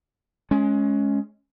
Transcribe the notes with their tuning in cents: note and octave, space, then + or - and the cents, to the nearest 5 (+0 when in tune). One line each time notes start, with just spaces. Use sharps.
G#3 +20 C#4 +0